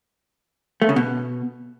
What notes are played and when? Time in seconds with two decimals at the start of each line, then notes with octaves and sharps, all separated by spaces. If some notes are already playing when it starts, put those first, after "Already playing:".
0.82 A3
0.89 C#3
0.96 B2